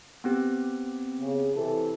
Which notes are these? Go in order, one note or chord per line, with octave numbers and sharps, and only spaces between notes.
B3 C4 G4
C#3
C3 E3 A4